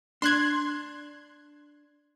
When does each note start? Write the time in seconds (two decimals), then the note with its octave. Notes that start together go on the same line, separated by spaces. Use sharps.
0.22 D4 C6 F#6 G#6